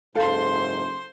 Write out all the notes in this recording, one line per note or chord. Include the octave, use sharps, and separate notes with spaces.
F#1 G#2 A4 C5 F5 C6